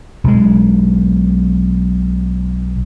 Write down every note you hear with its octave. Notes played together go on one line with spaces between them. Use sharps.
B1 G#3